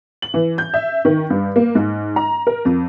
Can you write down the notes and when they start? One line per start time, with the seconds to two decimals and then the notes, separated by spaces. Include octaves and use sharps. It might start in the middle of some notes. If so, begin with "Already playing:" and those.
0.22 F#7
0.34 E3
0.58 G6
0.74 E5
1.05 D#3
1.30 G2
1.56 A#3
1.75 G#2
2.16 A#5
2.47 A#4
2.65 F2